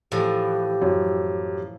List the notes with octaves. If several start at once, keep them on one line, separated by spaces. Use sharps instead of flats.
A2 E3 F3 G4
F#2